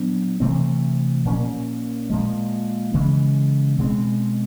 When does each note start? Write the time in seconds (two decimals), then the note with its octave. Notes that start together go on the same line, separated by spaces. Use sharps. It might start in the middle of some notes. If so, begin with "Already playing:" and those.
Already playing: A#2 F#3 B3 D4
0.40 C3 E3 A3 C4
1.25 A#2 F3 A#3 C#4
2.10 A#2 F3 G#3
2.94 C#3 E3 G#3
3.78 B2 G#3 C4